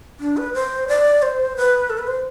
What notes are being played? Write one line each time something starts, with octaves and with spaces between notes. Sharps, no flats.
D4
B4
C5
D5
C5
B4
A4
B4
C5